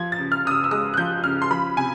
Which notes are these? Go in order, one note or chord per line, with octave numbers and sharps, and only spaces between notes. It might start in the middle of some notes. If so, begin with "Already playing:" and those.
Already playing: F3 G#6
A6
C#3
F6
C#3 D#6
E6
E6
G#3 D#6
F#6
F3 G6
C#3 F6
C6
F3 B5
C3 G#5